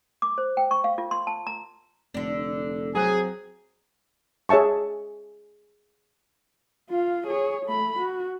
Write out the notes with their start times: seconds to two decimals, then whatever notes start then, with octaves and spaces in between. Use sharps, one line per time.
0.22 D6
0.38 C5
0.57 G5
0.71 C#6
0.84 F5
0.98 F4
1.11 C6
1.27 A5
1.47 A#5
2.14 F1 D3 D4
2.95 F#3 C4 G#4 F#6
4.49 G#4 C#5 E5 A5 C#6
6.90 F4 F5
7.27 G#4 C#5
7.66 A3 B5
7.99 F#4